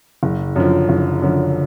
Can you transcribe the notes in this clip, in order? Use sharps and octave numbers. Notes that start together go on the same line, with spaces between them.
F#1
F#2 D3 F3
F#1
F#2 D3 F3